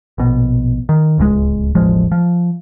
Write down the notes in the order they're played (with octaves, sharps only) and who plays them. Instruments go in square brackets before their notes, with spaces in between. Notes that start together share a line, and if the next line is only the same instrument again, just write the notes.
[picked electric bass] A#1 B2
D#3
D1 C#2 B2 G#3
E1 A1 F3 G#3
F3